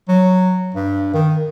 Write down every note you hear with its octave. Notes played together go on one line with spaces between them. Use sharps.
F#3
G2
D#3